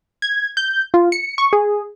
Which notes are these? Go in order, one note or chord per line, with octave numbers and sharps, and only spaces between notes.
G#6
G6
F4
C#7
C#6
G#4